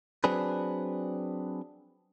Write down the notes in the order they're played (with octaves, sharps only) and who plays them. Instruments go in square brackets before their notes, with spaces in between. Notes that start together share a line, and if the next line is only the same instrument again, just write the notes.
[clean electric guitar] F#3 C4 D4 G#4 B4